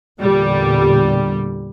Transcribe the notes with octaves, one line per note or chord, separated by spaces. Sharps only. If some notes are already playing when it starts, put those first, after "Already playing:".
E2 A#2 D3 G3